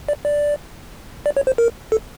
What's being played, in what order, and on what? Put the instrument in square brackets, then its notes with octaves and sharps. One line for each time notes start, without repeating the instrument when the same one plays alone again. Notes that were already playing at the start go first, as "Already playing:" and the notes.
[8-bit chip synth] D5
D5
D5
C#5
C5
A#4
A4